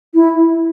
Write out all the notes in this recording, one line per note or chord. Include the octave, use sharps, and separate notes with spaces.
E4